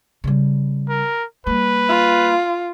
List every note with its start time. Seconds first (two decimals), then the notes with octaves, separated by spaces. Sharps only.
0.24 C#3 G3
0.89 A#4
1.47 G3 A#3 B4
1.89 F4